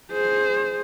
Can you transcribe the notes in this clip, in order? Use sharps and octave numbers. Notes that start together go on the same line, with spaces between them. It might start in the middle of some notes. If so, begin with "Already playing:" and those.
G#4 C5